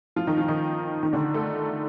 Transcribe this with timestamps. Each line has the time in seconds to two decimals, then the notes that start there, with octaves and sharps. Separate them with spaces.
0.16 F3 F4
0.27 D#3 D#4
0.37 F3 F4
0.48 D#3 D#4
1.03 D#3 D#4
1.13 D3 D4
1.34 A3 A4